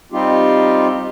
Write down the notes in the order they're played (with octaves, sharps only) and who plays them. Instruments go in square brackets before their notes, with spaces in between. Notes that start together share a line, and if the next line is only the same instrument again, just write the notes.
[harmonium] G3 C4 D#4 F4 G4